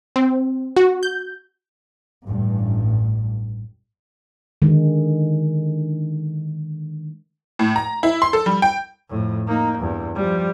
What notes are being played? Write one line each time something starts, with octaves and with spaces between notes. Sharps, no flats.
C4
F#4
G6
A1 G2
D3 D#3 G#3
A2
A#5
E4
C6
A4
G3
G5
F2 A2
A#3 D#4
E2 G2
F3 G3